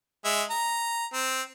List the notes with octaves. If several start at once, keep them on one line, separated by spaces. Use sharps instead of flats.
G#3 E5
A#5
C4